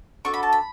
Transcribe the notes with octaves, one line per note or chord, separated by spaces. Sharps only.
D4 F#4 A4 C#6
B5
A5
B5